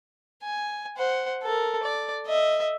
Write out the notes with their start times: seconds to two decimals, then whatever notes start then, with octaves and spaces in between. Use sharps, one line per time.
0.43 G#5
0.97 C5 F#5
1.43 A4 A#4
1.83 D5
2.26 D#5 E5